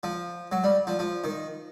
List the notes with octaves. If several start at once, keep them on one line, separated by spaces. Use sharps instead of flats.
F3
F#3
G3
F3
F3
D#3